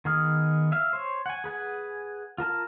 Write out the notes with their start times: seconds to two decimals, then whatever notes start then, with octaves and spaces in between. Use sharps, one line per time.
0.05 D#3 B3 G#4 D#6 F6
0.72 E5 F5
0.93 C5 C#5
1.26 F#5 G#5
1.44 G#4 B4 F#5 G#5
2.38 F4 A#4 A5 F6